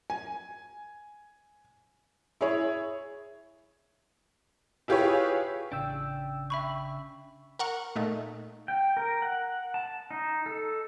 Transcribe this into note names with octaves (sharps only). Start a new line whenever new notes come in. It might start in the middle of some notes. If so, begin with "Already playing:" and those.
G#5
E4 G#4 C#5
E4 F4 G4 G#4 B4 C#5
A1 C#3 D4 G5 E6
E5 B5 C#6
A#4 F#5 C#6
A#2 A3 D#4
G5
A#4
F#5
A5
D#4
A4